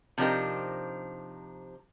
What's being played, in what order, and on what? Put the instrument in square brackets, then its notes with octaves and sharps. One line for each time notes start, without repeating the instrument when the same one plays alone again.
[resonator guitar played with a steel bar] C3 F3 D4 D#4 G4 A#4